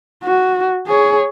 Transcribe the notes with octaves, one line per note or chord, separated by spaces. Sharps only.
F#4
G#4 C#5